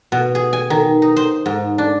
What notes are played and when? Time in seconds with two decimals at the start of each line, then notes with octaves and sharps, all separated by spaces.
0.12 B2
0.35 G#4
0.53 G#5
0.70 D#3
1.02 D#4
1.16 C5
1.46 G#2
1.78 D4